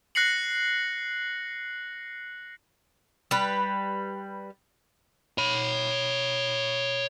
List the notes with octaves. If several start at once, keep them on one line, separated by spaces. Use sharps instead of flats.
F#6 A#6 C7 C#7 F#7
G3 B4
C#5 B5